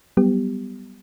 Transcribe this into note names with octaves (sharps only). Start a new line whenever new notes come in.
F#3 G3 B3 G4